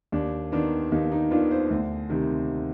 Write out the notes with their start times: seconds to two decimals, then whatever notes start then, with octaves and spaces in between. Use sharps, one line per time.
0.12 D#2 D4
0.52 D#3 B3 D4
0.92 D#2 D#4
1.12 D#4
1.31 D#3 B3 D4 F4
1.51 C5
1.70 D2
2.10 C3 D#3